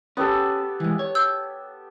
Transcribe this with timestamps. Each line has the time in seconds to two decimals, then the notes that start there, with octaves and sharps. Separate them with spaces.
0.17 B3 C#4 G4 A4
0.80 E3 G#3
0.99 C#5
1.15 E6 G6